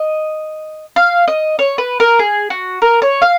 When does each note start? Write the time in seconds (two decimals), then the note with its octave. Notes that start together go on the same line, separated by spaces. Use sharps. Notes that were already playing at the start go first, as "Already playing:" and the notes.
Already playing: D#5
0.96 F5
1.28 D#5
1.59 C#5
1.78 B4
2.00 A#4
2.19 G#4
2.50 F#4
2.82 A#4
3.02 C#5
3.22 F5